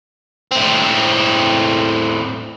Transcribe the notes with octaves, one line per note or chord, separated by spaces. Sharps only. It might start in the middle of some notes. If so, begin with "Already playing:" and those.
A2 C4